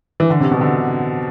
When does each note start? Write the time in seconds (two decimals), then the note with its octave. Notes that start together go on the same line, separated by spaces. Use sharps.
0.20 E3
0.30 D3
0.40 C3
0.51 B2
0.61 D3